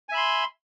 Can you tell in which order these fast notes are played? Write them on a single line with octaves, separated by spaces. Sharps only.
G#5 E5 B5 C6